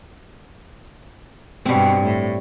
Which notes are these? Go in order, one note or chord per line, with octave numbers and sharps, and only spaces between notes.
G2 B2 G3 C4
A2